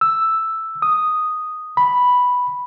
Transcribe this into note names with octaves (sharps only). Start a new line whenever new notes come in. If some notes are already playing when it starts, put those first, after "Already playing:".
E6
D#6
B5